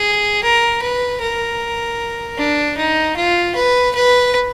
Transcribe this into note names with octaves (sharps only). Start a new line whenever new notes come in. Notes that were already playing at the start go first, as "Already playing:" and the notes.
Already playing: G#4
A#4
B4
A#4
D4
D#4
F4
B4
B4